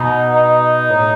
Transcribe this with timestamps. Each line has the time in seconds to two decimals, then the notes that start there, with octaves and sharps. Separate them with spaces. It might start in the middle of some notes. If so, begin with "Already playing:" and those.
Already playing: B2 D#4
0.30 D#4
0.90 A2